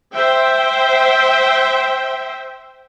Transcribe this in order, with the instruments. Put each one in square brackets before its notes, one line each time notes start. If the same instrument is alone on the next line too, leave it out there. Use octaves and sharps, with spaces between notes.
[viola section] C5 E5 G5